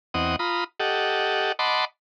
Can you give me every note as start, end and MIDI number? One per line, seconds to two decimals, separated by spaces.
0.14 0.36 40
0.14 0.36 60
0.14 0.36 75
0.14 0.36 78
0.14 0.36 87
0.39 0.64 65
0.39 0.64 82
0.39 0.64 83
0.39 0.64 87
0.80 1.52 67
0.80 1.52 69
0.80 1.52 75
0.80 1.52 78
1.59 1.85 75
1.59 1.85 78
1.59 1.85 81
1.59 1.85 83
1.59 1.85 84
1.59 1.85 86